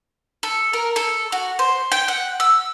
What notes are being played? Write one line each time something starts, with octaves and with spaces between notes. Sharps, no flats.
A4
A#4
A4
F#4
C5
G5
F#5
E6